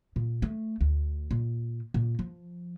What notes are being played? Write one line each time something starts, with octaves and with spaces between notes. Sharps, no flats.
A#2
A3
D2
A#2
A#2
F3